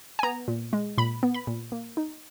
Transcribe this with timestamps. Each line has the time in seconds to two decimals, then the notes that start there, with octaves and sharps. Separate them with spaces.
0.19 G#5
0.23 B3 A#5
0.48 A#2
0.73 G#3
0.98 A#2 B5
1.23 B3
1.34 B5
1.47 A#2
1.72 A#3
1.97 D#4